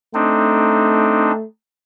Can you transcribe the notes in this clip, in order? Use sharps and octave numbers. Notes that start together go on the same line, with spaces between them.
A3 C4 D4 D#4